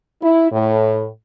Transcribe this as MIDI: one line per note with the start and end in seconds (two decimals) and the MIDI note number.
0.21 0.47 64
0.52 1.06 45